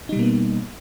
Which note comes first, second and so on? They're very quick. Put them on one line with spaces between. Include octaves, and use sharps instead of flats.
D#4 G3 B2 A#3 B3